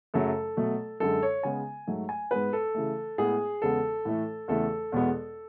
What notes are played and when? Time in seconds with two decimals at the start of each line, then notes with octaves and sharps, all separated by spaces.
0.14 F#2 C#3 F#3 A3 A4
0.57 B2 F#3 A3
1.00 F#2 D3 G#3 A4
1.23 C#5
1.43 C#3 G#3 B3 G#5
1.87 G#2 F#3 A3
2.09 G#5
2.31 G#2 G#3 B3 B4
2.53 A4
2.75 C#3 E3 A3
3.18 A2 G#3 B3 G#4
3.62 E2 C#3 G#3 B3 A4
4.05 A2 E3 A3
4.48 E2 C#3 E3 A3 A4
4.92 E2 B2 G#3 B3